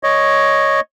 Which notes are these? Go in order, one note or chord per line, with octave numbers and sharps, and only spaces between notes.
C#5 D#5